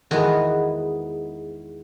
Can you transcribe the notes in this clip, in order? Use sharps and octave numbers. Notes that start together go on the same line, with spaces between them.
E2 D#3 G#3 B3 F#4